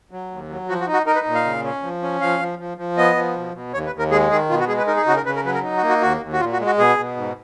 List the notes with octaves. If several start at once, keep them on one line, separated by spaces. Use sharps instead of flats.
F#3
D#2
F#3
F3 F#4
F#4
D#4
F#4
D#4 A#4
B4
A#2
F5
C#3
C#4
F3
C#4
F3 F5
F3
F3
F3
B3 D#5
F3
B2
B2
D#2 C#5
B4
D#2
A#4
G#3 G#4
D#3 G#4
B2 F4
F#4
G#3 G#4
B4
D#4 A#4
G#4
C#3 F#4
A#4
C#3 B4
A#4
F#3 B4
A#4
D#4
F#4
A#3
F#4
D#2 F#4
D#2
F#4
A#2 F4
F#4
G#3
F#4
B2 G#4
B2
G#2